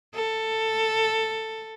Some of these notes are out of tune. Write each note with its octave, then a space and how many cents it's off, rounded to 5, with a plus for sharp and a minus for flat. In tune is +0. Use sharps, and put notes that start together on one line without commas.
A4 +10